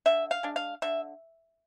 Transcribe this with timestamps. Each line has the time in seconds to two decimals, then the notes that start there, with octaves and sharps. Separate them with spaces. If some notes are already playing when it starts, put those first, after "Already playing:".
0.06 D3 E5
0.31 F5
0.43 G#3 D4
0.56 F5
0.82 D3 E5